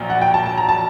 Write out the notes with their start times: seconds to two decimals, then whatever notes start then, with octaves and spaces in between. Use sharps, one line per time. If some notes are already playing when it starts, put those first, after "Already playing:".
Already playing: A#1 A#2 F#3
0.10 F#5
0.21 G5
0.34 A5
0.46 A5
0.58 A#5
0.69 A5